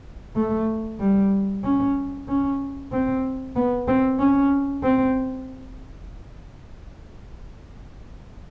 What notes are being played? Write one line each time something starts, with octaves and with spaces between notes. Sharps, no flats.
A3
G3
C#4
C#4
C4
B3
C4
C#4
C4